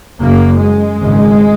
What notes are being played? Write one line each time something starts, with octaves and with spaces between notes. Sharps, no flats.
F#1 F#2 C#3 A#3
G#3
G#1 F#2 C#3